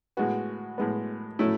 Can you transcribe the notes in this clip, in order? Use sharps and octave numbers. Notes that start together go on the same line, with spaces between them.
A2 G#3 B3 F#4
A2 G#3 B3
A2 F#3 A3 C#4 E4